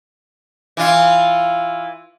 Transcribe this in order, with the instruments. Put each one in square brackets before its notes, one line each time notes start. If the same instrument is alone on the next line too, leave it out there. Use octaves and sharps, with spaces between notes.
[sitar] E3 F4